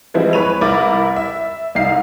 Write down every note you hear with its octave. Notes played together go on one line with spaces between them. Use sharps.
E3 F3 G3 G#3 C4 E4
E2 B4 C#5 B5 D#7 F7
C2 E4 A#4 B5 D6 A6
E5
C2 D#4 E5 F5 C7